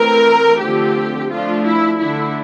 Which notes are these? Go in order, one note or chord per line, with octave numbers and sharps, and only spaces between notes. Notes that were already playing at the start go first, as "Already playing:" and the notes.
Already playing: E3 A3 C4 A#4
D3 F3 A3 C4 G4
F3 A3 D4 F4
E4
D3 A3 D4 E4